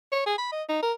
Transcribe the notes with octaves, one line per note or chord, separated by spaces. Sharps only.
C#5
G#4
B5
D#5
D#4
A#4